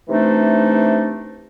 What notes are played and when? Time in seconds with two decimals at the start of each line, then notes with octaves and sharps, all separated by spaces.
0.09 C3 E3 A3 D4 D#4